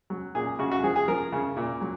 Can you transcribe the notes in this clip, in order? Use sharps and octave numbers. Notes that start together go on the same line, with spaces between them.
F#3
A#2 G#4
C#3 F#4
F#4
F3 G#4
G#4
F3 A#4
C#3
A#2
F#3